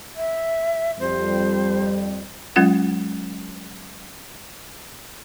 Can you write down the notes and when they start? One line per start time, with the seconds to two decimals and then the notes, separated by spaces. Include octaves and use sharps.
0.16 E5
1.00 F2 G3 C5
2.56 F#3 G#3 C#4 F4 F#5 A6